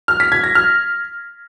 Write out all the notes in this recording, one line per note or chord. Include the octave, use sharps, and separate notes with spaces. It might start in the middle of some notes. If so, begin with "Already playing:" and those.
F6
B6
G#6
A#6
F6